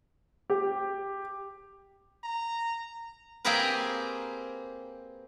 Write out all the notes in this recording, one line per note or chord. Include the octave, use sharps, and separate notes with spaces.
G4
A#5
A#3 C4 G4 G#4 A#4 B4